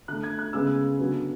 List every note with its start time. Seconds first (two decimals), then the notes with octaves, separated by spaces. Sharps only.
0.08 D3 A3 F#6
0.23 G#6
0.39 F#6
0.53 C#3 G#3 B3 E6
0.99 D3 F#3 B3